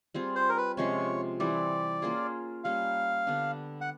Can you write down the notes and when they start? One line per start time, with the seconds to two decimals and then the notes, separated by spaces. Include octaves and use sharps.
0.14 G3 C4 F4 G#4
0.36 C5
0.49 A#4
0.57 B4
0.77 C3 F3 G#3 C#4 C#5
1.40 E3 G3 C4 D5
2.02 A#3 C#4 F4 G#4
2.64 G3 A#3 C#4 F5
3.27 D3 G3 B3 D4
3.81 F#5